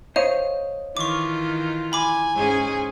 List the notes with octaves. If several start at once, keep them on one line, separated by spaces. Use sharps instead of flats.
C5 C#5 D#5 F5
D#3 E3 F4 C#6 D6
G#5 B5 D6
G#2 C#4 G#4